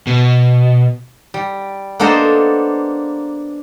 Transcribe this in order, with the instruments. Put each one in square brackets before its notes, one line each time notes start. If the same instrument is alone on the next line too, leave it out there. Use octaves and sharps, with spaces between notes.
[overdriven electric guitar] B2
[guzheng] G3
A#3 B3 D4 A4 C5 D#5